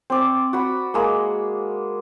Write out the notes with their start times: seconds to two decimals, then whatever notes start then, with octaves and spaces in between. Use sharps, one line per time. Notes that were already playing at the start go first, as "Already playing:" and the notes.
0.10 C4 D5
0.53 F#4 B5
0.94 G#3 A#3